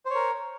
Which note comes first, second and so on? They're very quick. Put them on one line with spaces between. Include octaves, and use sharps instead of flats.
C5 C#5 A#4